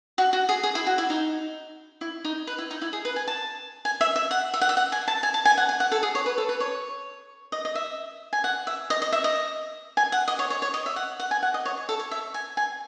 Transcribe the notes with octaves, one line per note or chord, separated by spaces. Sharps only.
F#4
F#4
G#4
G#4
E4
F#4
E4
D#4
E4
D#4
B4
E4
D#4
E4
G#4
B4
G#5
A5
G#5
E5
E5
F#5
E5
F#5
E5
F#5
G#5
A5
G#5
A5
G#5
F#5
G#5
F#5
A4
G#4
C#5
B4
A4
B4
C#5
D#5
D#5
E5
G#5
F#5
E5
D#5
D#5
E5
D#5
G#5
F#5
D#5
C#5
C#5
C#5
D#5
E5
F#5
F#5
G#5
F#5
D#5
C#5
C#5
A4
C#5
E5
G#5
G#5